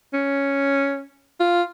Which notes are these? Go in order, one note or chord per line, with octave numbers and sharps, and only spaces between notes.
C#4
F4